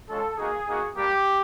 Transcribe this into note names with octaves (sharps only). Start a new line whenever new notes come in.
G#3 C#4 F4 A4
A#3 D#4 F#4 G#4
A#3 D#4 F#4
G3 A#3 D4 G4